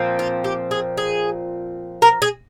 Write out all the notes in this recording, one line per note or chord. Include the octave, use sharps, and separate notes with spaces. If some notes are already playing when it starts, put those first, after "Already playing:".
Already playing: A#2 F3 C4
F4
G4
G#4
G#4
A#4
G#4